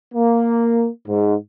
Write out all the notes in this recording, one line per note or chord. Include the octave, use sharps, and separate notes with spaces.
A#3
G#2